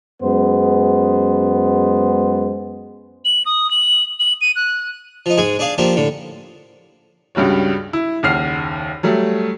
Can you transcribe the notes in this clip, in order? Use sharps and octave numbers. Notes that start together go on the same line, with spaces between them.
F#2 G#3 B3 C5
F#7
D#6
F#7
F#7
D#7
F#6
F3 D#4
G#2 G#3 G#4 G#5
D4 G#4 D5 F5
F3 A#3 D4 G4
A2 D3
C#2 G2 G3 F#4 C#5
E4
F#1 D#2 F#5 F6 C7
F#3 G3 A3